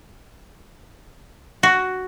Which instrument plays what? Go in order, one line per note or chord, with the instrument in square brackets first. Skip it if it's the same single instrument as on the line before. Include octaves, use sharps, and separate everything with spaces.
[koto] F#4